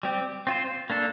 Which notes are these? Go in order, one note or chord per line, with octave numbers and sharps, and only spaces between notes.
G3 C4 G4
C4 F4 C5
A#3 D4 A4